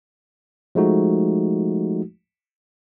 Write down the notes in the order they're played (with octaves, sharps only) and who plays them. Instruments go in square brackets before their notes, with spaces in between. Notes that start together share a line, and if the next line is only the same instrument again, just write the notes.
[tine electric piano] F3 G#3 A3 D#4 F#4